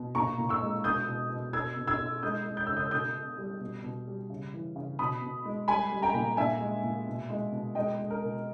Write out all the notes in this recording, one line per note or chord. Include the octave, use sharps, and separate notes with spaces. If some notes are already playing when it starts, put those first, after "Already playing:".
Already playing: B2
A#2 A#5 C#6
A#2
C#6 E6
G#3
B2 D#6 G6
B2
B2
B2 E6 G#6
B2
E6 G#6
B2
G#3 D#6 G6
G#3
G6
C#3 E6
D#6 G6
B2 D#6 G6
B2
G3
B2
B2
G3
C#3
E3
C#3
B2 B5 D#6
B2
G#3
G3 G#5 B5
G3
G5 A#5
A#2
A#2 E5 G#5
G#3
A#2
B2
G#3
B2
G#3 D#5 G5
G#3
A#4
B2